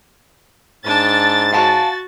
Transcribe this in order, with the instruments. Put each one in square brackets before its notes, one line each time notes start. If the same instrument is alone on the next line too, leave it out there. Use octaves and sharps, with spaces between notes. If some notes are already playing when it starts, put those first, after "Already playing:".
[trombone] G#2 [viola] D4 A5 [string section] A6
[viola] F#4 [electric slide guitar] F5 F#5 A5